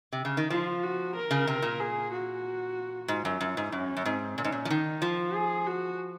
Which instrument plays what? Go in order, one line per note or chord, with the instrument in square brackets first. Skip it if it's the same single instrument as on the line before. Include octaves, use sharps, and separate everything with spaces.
[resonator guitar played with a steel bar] C3
C#3
D#3
[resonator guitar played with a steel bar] F3 [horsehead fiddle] F4
[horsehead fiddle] F#4
A#4
[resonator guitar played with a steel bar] C#3
C3
A#2
[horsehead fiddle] G#4
F#4
[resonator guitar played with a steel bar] G#2 [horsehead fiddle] F4
[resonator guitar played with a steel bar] F#2
F#2
G#2
[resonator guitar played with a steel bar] F#2 [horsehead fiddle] C#4
[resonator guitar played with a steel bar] F#2
[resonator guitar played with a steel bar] G#2 [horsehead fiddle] C4
[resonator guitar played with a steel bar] A#2 [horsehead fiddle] C#4
[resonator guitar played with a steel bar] G#2
A#2
F3
[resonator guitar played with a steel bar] D#3 [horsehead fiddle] D#4
[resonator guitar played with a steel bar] F3 [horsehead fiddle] F4
[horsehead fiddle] G#4
F#4